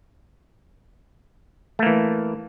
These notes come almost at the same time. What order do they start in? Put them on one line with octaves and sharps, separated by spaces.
A3 A#3 E3